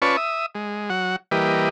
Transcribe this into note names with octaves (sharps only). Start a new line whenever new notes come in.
C#4 F4 B4 D5 A5 C#6
E5 D#6
G#3
F#3 F#5
E3 G3 A#3 G4 B4 D#5